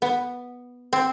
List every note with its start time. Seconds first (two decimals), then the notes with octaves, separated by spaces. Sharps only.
0.02 B3
0.93 C4